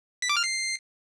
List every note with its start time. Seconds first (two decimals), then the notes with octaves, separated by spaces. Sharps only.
0.22 B6
0.29 D6
0.37 F6
0.44 C7